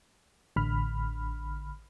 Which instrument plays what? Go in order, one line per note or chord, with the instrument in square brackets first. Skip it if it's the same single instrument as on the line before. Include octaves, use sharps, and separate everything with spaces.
[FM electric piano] A1 D3 B5 F6